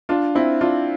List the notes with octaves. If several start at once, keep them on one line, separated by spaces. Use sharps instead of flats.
D4 F4
C4 E4
D4 F4